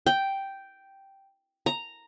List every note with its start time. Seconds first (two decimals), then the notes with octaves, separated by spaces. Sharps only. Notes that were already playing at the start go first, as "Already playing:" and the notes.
0.06 G5
1.66 A#5